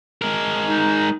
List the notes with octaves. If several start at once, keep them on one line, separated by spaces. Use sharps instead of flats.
G#3 A#4
D#4